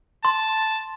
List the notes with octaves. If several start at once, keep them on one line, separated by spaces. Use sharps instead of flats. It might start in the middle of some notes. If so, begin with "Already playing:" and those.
A5 C6